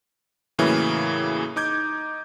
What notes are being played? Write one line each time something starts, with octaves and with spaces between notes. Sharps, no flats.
A2 C#3 E3 F#3 A#3 E4
D#4 D6 G6 G#6